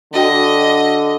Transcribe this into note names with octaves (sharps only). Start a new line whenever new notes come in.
D3 D4 F#4 D#5 G5